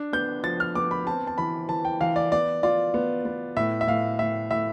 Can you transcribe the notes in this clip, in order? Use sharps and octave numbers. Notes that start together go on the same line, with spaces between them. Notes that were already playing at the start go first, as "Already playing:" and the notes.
Already playing: D4
B3 G6
F3 A6
F6
B3 D6
B5
C4 A5
A5
E3 B5
E3 A5
G5
E3 F5
D5
B3 D5
F4 D5
B3
B3
A2 E5
E5
A2 F5
A2 E5
A2 E5